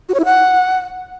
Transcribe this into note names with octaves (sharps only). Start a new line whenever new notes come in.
F#4
C#5
E4
F#5